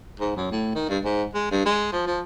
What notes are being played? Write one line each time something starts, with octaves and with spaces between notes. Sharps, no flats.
G#2
F#2
A2
D#3
G2
G#2
G#3
G2
G#3
F3
F3